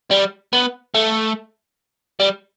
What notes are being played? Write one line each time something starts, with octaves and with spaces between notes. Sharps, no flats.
G3
B3
A3
G3